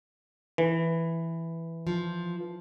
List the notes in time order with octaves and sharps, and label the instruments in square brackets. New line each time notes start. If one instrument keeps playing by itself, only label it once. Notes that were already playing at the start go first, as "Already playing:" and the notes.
[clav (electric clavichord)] E3
[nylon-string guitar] F3